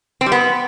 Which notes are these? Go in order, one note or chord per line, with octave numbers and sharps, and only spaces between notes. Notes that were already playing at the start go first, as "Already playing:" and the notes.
C4
G3
B3